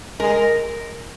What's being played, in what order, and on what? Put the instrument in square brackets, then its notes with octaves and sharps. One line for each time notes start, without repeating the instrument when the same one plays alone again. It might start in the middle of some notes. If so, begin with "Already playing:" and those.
[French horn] G#3 [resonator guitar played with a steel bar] A#4